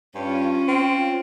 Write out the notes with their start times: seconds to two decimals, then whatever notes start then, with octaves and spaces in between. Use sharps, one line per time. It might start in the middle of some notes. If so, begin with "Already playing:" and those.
0.15 G2 C#4 F4
0.68 C4